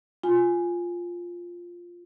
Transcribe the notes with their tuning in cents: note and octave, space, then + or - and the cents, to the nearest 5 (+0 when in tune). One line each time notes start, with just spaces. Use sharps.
F4 +0 G#5 +0